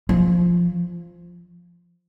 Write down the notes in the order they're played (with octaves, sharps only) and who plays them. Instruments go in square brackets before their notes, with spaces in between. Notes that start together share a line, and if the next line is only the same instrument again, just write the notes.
[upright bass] F3